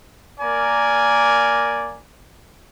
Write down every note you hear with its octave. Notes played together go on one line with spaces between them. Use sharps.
A#3 A#4 D5 G#5